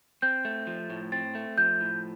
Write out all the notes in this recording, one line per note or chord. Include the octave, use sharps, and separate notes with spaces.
C4 G6
A3
F3
A2
C4 A6
A3
F3 G6
A2